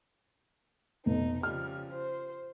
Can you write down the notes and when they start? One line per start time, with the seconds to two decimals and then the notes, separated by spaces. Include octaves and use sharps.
1.06 F1 B2 D#4
1.43 C#3 F3 G3 F6
1.93 C5